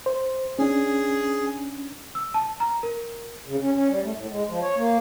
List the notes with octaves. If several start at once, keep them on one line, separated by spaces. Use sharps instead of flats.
C5
C#4 D4 G#4
E6
A5
A#5
A#4
C#3
C#4
C#4
G3
A3
A2
G#3
F3
C#5
A#3